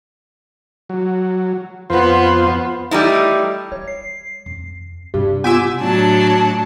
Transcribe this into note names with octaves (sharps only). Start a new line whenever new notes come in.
F#3
F2 B3 F4 B4 C5
G3 A3 D#4 E4
G3 C#5
C7
F2
G2 C3 C4 G4
B3 F4 G4 G#5 C6 D6 E6
A2 F#3 D4 A5